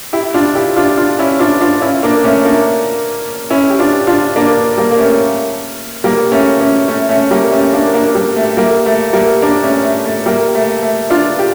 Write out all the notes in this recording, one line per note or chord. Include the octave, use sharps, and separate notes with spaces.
E4 G4
D4 F4
E4 G4
D4 F4
D4 F4
C#4 E4
D4 F4
D4 F4
C#4 E4
A#3 D4
A3 C#4
A#3 D4
C#4 E4
G4
D4 F4
D4 F4
A#3 D4
G3 A#3
A#3
A3 C#4
G3 A#3
A3 C#4
A3 C#4
A3 C#4
A3 C#4
G3 A#3
A3 C#4
A#3 D4
A#3 D4
G3
A3
G3 A#3
A3
G3 A#3
A#3 D4
A3 C#4
A3
A3
G3 A#3
A3
A3
D4 F4
G4